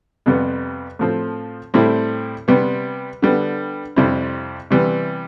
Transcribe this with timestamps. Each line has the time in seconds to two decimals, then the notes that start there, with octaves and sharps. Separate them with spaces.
0.26 F2 C3 G3 B3
0.99 A2 F3 C4
1.74 A2 G3 C4 E4
2.48 C3 G3 B3
3.22 D3 G3 B3
3.96 F2 C3 G3 C4 E4
4.71 C3 E3 G3 B3